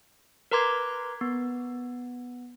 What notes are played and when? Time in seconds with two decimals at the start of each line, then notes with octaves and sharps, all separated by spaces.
0.51 A#4 B4 A#5 C6 D6 G#6
1.21 B3